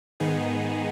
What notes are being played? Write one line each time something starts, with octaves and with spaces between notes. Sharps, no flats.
G#2 D#3 B3 D#4 G#4